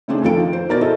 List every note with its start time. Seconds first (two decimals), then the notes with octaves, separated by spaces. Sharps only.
0.08 C#3 A3 C4 D4 D#4 G#4
0.22 F2 D#3 F4 A4 F5 D7
0.40 D#4
0.53 C5
0.69 B2 D#4 A#4 D5 A6
0.81 E4 G#4 A4 C5 D#5